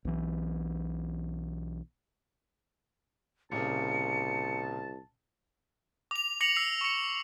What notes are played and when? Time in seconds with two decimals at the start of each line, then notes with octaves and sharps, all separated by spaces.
0.05 B1 E3
3.52 C2 A#2 C#3 A5 C#7
6.11 D6 F7
6.40 D6 A#6 C#7 F7 F#7
6.56 E6 C7 F7
6.81 C#6 C#7